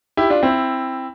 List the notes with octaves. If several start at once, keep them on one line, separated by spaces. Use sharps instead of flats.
E4 G4
D4 F4
C4 E4